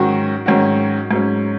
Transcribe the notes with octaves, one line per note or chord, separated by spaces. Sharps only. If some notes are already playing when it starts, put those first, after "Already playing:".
Already playing: G#2 D#3 F#3 C#4 F#4
G#2 D#3 F#3 C#4 F#4
G#2 F#3 C#4